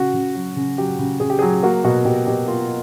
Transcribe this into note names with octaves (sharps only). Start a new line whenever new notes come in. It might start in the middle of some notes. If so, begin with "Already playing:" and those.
Already playing: C#3 F#4
C#3
F#3
C#3
F#3 G4
C#3
C#3 G#4
G4
G#4
F#3
A#3 F#4
B2 F#4
B2 G4
B2 G4
A#3 F4